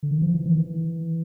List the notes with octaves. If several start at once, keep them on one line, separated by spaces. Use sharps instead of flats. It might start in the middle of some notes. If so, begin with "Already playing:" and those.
D3
D#3
F3
E3
D#3
E3